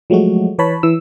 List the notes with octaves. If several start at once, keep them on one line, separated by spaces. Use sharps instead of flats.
F3 F#3 G#3 A3 F#4
E3 B4 C#5 A5 B5
E3 E6